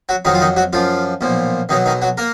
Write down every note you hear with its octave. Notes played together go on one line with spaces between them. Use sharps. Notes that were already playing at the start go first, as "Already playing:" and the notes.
F#3 F#4
F2 D#3 F#3 D#4
F4
D#3 D#4
F#3 F#4
F#2 F3 F4
B1 A#2 F3
B1 B2 D#3 F#3 D#4
D#3 D#4
F#3 F#4
A#3 A#4